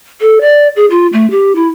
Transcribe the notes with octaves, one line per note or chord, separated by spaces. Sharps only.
A4
D5
G#4
F4
A3
G4
E4